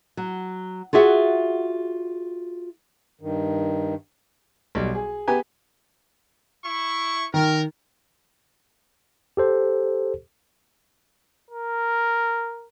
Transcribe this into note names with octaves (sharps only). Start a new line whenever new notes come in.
F#3
F4 F#4 G#4 E5 F#5
G2 D#3
B1 G3
G#4
B3 G4 G#5
E4 C#6
D#3 A#4
G4 A4 C5
A#4